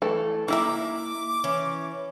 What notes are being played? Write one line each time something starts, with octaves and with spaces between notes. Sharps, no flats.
E3 A3 A4
A#3 D#4 E4 E5 A#5 D6
E3 C#4